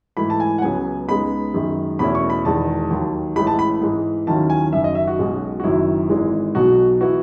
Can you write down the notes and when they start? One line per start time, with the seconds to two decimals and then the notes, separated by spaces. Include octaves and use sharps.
0.17 G#2 E3 A3 E4 B5
0.30 A5
0.40 G#5
0.58 F#5
0.62 C#2 C#3 F#3 B3 G#5
1.08 C#2 C#3 G#3 B3 D#4 B5
1.54 F#2 D#3 G#3
1.99 E2 B2 A3 C#4 E4 B5
2.15 C#6
2.30 B5
2.45 E1 E2 D#3 G#3 A5
2.91 D#2 D#3 F#3
3.36 A1 A2 E3 G#3 B5
3.47 A5
3.59 B5
3.82 G#2 E3 G#3
4.27 D#2 D#3 F#3 C#4 E4 A5
4.50 G#5
4.73 F#1 F#2 D#3 E5
4.84 D#5
4.95 E5
5.07 F#4
5.18 B1 B2 G#3 C#4
5.60 F#4
5.64 F#1 F#2 D#3 F#3 E4
6.09 G#1 G#2 E3 G#3
6.55 B1 B2 F#3 F#4
7.01 E3 B3 E4 F#4